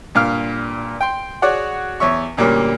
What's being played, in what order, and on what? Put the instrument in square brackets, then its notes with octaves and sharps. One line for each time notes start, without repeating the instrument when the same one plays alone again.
[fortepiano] G2 A#2 F5 F6
G5 C6
F#4 G#4 C#5 D5 F#5
E2 C#5 E5 C#6
D2 A#2 G3 A#3 C#4